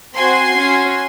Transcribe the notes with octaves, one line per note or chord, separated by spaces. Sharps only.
C4 F#4 G#5 C6
C#4 F#4